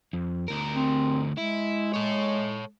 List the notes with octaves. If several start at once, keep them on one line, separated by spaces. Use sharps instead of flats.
F2
D2 A#4
C4
G#3 E4
A4 C#5